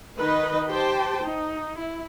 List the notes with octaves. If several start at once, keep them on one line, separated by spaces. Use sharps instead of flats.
D#3 D#4 B4 D#5
G4 C5 G5 A5
D#4
E4